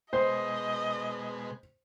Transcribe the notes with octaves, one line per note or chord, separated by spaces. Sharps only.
B2 G#3 C5 D#5